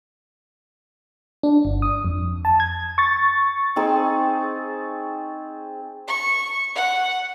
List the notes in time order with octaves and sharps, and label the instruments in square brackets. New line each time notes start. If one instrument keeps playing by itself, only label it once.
[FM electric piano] D4
G1
D#6
F2
A5
G#6
C#6 A6
[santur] C4 D#4 G#4
[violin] C#6
F#5